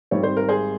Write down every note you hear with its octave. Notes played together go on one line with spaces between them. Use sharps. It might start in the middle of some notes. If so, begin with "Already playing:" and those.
G#1 G#2 G3 C4 C#5
C5
A#4
G#4 C5